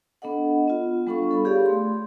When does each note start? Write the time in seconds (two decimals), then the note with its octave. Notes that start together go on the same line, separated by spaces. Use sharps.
0.22 B3 D4 A4 D#5 F#5
0.68 B3 F4
1.07 G3 B3 D4 A4 F5 C#6
1.31 A4 C#5 B5
1.45 G4 G#4 D5 F5
1.66 A3 C6